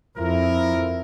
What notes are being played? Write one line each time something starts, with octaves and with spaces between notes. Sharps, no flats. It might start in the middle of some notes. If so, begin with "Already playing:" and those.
F2 F3 E4 A#4